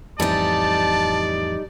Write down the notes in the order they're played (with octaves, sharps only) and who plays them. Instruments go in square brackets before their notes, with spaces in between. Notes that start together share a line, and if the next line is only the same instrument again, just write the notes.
[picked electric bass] F2 A2 E3 [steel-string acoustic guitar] G3 D#4 [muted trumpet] D5 [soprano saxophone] A5